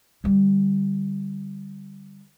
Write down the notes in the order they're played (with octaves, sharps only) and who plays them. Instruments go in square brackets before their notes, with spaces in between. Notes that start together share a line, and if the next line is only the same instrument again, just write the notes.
[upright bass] D3 G3